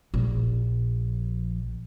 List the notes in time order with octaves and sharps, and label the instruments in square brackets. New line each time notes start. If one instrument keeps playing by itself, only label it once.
[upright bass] A#1 F3